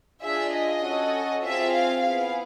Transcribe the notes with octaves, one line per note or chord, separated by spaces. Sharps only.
D4 F4 G#4 E5
D#5
C#4 F#4 A4
C4 F4 G#4 E5
F5
B3 E4 G#4 F5